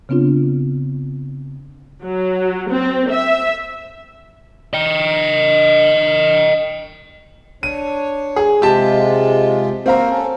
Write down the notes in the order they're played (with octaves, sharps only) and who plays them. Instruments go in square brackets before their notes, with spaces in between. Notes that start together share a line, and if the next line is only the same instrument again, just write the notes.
[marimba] C#3 B3 C4 D4 F4
[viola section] F#3
C4
E5
[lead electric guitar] D#5 G5
[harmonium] D4 C#5 [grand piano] D#7
[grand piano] G#4
[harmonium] C3 G#3 F4 [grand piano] G4 A5
[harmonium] A#3 F#4 A#4 [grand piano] C4 F5 A#5
[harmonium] C#4 A4